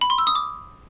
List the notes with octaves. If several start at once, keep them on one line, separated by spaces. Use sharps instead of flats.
B5
C6
E6
D#6
D6